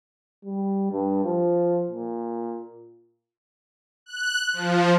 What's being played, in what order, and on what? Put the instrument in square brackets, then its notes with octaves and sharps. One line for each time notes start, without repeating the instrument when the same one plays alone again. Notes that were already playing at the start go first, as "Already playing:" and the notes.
[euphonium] G3
G2
F3
A#2
[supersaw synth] F#6
F3